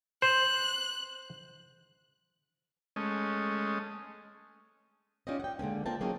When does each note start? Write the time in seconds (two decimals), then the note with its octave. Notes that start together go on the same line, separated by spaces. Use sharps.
0.22 C5 F#6
2.96 G#3 A3 C#4 D#5
5.27 C#4 D#4 F4 G4 D5 D#5
5.40 F#5 G5
5.59 D3 G#3 A#3 C#4
5.86 A#3 C4 F4 A#4 G5 A5
6.01 F#3 A#3 C4 C#4 D#4 G#4